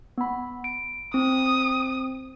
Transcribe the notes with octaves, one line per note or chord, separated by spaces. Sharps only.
B3 B5
D7
C4 D#6